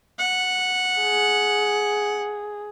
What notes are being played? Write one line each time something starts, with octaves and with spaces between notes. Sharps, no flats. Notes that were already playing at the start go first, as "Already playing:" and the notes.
F#5
G#4